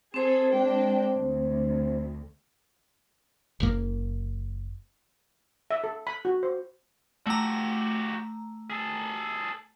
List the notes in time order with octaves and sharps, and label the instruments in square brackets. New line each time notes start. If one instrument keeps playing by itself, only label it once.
[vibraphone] C4 C5 [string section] G#4 A4
[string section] G#3 D4 G5
D2
[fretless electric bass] F#1 F#2 A#3
[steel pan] E5
A4
B5
F#4
C5
[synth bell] A3 A#5 [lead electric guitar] F#4 G4
[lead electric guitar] G#4 A4